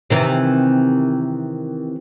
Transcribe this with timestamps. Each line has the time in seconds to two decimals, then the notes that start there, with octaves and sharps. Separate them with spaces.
0.10 C3 D#3 E3